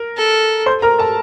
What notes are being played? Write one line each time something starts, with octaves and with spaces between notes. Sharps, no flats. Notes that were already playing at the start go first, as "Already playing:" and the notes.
Already playing: A#4
A4
C5 C6
A#4 A#5
A4 A5